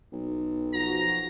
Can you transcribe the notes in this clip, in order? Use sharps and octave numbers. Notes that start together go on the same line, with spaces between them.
B1
F3 F#4 A#5